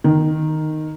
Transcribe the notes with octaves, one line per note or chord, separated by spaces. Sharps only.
D#3